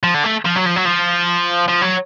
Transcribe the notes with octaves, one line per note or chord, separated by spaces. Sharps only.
F3
D3
A3
F3
F#3
F3
F#3
F3
F3
F#3